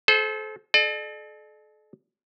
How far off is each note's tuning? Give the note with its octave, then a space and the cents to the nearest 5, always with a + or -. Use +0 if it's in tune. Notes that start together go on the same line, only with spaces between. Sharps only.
A4 -35 C5 +0
A4 -40 D5 +40